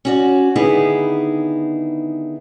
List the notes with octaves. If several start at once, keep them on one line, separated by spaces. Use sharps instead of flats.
C#4 F#4 D5
D3 D#3 B3 D#4 E4 G#4